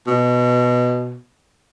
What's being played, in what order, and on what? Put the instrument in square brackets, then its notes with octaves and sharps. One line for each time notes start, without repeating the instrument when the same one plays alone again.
[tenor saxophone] B2